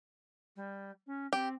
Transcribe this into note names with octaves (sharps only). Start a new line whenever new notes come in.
G3
C#4
C4 G4